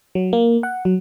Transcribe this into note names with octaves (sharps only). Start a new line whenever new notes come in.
F#3
A#3
F#5
F#3